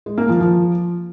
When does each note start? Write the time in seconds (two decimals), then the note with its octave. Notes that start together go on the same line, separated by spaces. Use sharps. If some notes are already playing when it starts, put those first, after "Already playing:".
0.06 G#3
0.18 A#3
0.29 F3
0.40 F3